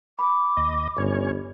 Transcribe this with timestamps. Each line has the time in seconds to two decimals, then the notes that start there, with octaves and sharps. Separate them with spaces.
0.19 B5 D6
0.57 D#2 D#5
0.98 G1 G2 C#4 C#5